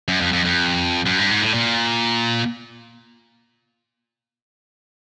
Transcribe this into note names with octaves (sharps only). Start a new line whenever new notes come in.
F#2
F2
F2
F2
F#2
G2
G#2
A2
A#2